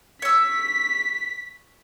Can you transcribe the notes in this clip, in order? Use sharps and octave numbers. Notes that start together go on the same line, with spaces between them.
C#5 E6 B6